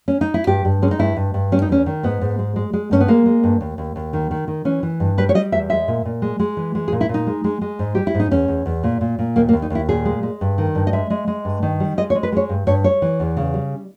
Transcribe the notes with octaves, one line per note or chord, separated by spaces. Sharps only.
C#4
D#4
E4
G2 G4
G2
G#3 C#4
D#4
G2 E4
G2
G2
G3 C#4
D#4
E2 C#4
D#3
G#2 B3
G#2
G#3
G#3
G#3
G2 C#4
B3
G#3 A#3
G#3
G2
D#2
D#2
D#2
D#3
D#3
D#3
E3 C#4
E3
G2
G3 B4
C#5
G3 D#5
E2 E5
G#3 E5
A#2
A#2
G#3
G#3
E3
G#3
G#4
A#2
E4
A#2 D#4
G#3
G#3
G#3
G#2
G3 G4
E4
G#2
D#4
E2 C#4
E2
E2
A#2
A#2
A#2
D#2 A#3
A#3
D#2
D#4
D#2 E4
A#2 G#4
G#3
G#3
G2
D#3
G2
D#5
G#3 E5
G#3
G#3
G2
D#3
G3
G#3 D#5
C#5
G#3
B4
G#3 C#5
G2
G2 C#5
G3 C#5
E3
E2
C#3
G3